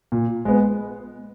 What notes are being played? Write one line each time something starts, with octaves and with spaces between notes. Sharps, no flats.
A#2
G#3 B3